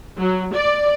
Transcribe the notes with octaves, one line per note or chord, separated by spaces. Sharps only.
F#3
D5